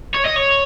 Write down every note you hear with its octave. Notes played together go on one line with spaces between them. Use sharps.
C#5
D#5
C#5